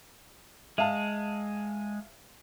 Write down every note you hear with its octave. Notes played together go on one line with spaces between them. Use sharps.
G#3 E5 F5 A5